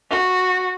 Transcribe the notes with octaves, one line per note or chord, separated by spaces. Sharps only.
F#4